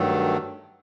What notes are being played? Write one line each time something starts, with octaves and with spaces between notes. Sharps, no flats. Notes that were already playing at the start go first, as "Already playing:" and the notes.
Already playing: G2 D#3 F#3 A3